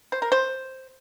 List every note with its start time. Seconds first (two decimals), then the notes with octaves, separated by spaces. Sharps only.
0.12 C5
0.22 A#4
0.32 C5